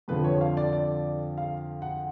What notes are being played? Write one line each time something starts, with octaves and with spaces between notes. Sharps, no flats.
F2 D3 F3 B4
C#5
F5
D5
D5
F5
F#5